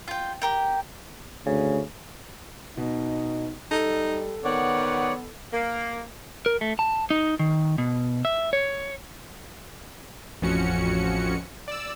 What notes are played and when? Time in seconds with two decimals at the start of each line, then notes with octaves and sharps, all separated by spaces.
0.08 F4 G5
0.42 G4 A#4 G5
1.46 D2 C#3
2.77 B2 D#4
3.71 G3 D#4 A4
4.44 D#3 B3 C#5 D5 F#5
5.53 A#3
6.46 A#4
6.61 A3
6.79 A5
7.10 D#4
7.39 D#3
7.78 B2
8.25 E5
8.53 C#5
10.42 A1 F2 F3 C#4 F#4 C#7
11.68 D5 E6